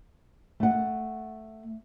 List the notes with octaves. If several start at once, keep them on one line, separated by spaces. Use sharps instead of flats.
A3 F#5